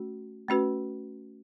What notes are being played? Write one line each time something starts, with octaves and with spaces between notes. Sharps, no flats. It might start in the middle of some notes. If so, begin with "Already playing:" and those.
Already playing: A3 C#4 F#4
A3 C#4 F#4 B4